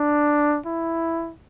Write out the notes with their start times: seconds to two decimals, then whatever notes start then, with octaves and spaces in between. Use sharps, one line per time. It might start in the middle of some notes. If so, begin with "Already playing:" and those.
Already playing: D4
0.66 E4